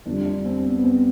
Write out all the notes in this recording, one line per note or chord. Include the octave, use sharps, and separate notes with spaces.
F2 D3 G3 D4
D4
C4
C4
B3
B3
C4